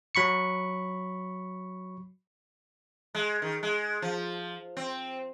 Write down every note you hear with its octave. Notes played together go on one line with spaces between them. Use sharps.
F#3 B5 C#6 C#7
G#3
D#3
G#3
F3
C4